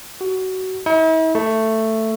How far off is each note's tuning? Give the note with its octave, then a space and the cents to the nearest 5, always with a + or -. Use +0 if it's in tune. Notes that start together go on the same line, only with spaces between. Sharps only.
F#4 +20
E4 -45
A3 +10